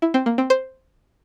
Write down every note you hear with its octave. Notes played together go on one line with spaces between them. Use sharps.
E4
C4
A#3
C4
C5